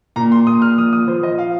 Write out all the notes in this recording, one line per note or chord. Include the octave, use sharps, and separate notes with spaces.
A#2 A#5
C6
A#2 D#6
F6
F3 D#6
D#6
F3 C5
D#5
F5